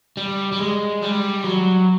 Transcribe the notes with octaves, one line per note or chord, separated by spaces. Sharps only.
G3
G3
G#3
G3
F#3